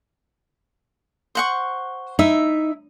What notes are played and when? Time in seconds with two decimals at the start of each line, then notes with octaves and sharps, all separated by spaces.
1.35 C5 F#5 C#6
2.19 D#4 E4 E5